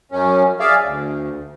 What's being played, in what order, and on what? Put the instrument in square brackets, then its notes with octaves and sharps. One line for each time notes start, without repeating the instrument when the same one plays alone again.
[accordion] F#2 C#4
G#4 D5 E5 F5
D2